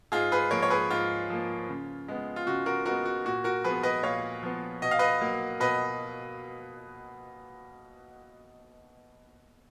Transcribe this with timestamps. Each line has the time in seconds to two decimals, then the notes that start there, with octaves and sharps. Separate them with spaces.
0.12 G#2 F4 G#4
0.32 G#4 B4
0.51 F3 A#3 A#4 C#5
0.63 C#5
0.70 G#4 B4
0.90 G#2 F4
1.30 F3 A#3
1.69 C#3
2.08 G#3 B3
2.36 F4
2.46 C#3 F#4
2.66 F#4 A#4
2.85 G#3 B3 F#4 A#4
3.05 F#4
3.25 A#2 F#4
3.44 F#4 A#4
3.64 F3 B3 G#4 B4
3.83 B4 D#5
4.03 A#2 C#5 F5
4.43 F3 B3
4.82 B2 D#5
4.91 F5
4.99 B4 D#5
5.21 F#3 A#3
5.60 B2 B4 D#5